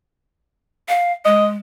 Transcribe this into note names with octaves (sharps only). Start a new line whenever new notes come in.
F5
G#3 D#5